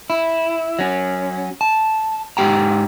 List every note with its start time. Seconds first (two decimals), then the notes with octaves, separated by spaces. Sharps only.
0.10 E4
0.79 F#3 C#4
1.61 A5
2.37 G#2 C4 G4 G5 A#5